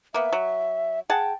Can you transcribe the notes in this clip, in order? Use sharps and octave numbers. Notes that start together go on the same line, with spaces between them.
A#3 B3 E5
F#3
G#4 F#5 G5 A5